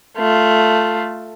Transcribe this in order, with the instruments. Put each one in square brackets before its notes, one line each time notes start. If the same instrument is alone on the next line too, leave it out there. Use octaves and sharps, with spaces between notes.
[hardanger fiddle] A3 F4